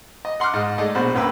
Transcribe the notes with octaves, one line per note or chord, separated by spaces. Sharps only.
D#5
F#5 C6 D6 F6 F#6
G#2 D#5
G#3 A3 D#4 D5 D#5
A#1 B2 F#4 C5 B5
A#1 F#2 A#3 B4 G5 E6